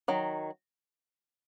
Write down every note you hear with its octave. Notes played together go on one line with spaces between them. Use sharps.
D#3 F#3